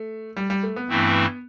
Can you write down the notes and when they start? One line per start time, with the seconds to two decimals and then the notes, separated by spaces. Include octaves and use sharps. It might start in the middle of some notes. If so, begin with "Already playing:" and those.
Already playing: A3
0.37 G3
0.50 G3
0.63 A3
0.76 B3
0.89 G2 E3 A3 C4 E4